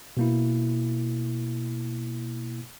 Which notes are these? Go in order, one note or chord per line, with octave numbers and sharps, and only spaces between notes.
B2 A#3 E4